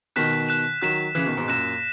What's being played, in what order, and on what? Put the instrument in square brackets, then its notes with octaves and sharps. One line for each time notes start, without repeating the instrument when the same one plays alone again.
[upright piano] B2 D#3 [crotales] F#6 B6 E7
[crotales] F#6 B6 E7
[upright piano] D#3 F#3 [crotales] F#6 B6 E7
[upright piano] C#3 E3 [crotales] F#6 B6 E7
[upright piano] B2 D#3
G#2 B2
[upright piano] F#2 A#2 [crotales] F#6 A#6 E7